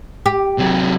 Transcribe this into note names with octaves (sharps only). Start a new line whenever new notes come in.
G4
C3 F#3